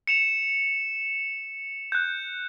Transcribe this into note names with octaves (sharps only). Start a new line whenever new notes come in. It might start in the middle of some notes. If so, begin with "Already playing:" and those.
C#7 E7 F7
F#6 G6